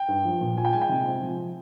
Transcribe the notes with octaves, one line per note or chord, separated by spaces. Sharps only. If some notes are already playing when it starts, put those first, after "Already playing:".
Already playing: G5
G2
F3
A#2
F4 G#5
G5
G#3 G#5
G5
C3
C4
F3